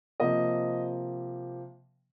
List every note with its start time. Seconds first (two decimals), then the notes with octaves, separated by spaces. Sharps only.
0.20 C3 F3 A#3 D#5